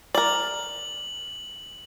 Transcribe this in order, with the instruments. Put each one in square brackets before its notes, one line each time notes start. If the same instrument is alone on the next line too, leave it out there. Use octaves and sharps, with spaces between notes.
[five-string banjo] A#4 D5 [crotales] F#7